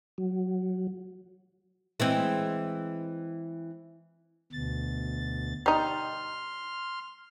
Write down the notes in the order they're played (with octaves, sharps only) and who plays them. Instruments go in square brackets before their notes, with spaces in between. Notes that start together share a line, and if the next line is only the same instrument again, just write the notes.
[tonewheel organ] F#3
[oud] E3 G#3 C4
[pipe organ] D2 B2 A6
[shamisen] G3 D#4 [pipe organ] C6 F6